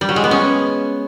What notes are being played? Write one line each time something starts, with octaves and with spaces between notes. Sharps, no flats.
G3
F#3
G#3
B3
C#4